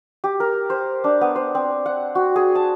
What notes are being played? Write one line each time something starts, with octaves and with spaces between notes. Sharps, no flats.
G4
A#4
C5
D4
B3
C5
C4
F#5
F#4
G#4
A5